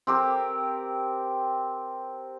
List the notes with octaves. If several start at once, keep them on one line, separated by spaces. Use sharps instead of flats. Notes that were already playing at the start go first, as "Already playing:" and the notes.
C4 G4 A#4